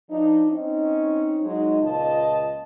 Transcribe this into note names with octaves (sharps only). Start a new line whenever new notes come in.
F3 D4 D#4
C4 C#4 D#4
F#3 G#3 D#4
C#2 A#2 F4 D#5 A5